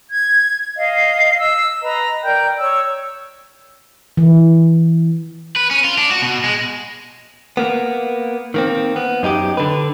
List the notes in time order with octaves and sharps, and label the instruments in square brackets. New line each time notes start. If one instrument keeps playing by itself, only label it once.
[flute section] G#6
D#5 F5
E6
B4 D#5 A#5
A#4 D5 G5 G6
C#5 E6
[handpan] E3
[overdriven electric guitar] B4
C#4
F4
D4
F#4
B2
G#3
[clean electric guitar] A#3 B3
D#3 A#3 C4
B3
F#2 D#4 F#4 G4
D3 B4